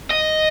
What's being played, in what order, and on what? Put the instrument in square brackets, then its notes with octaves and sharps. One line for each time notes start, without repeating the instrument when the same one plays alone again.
[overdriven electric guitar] D#5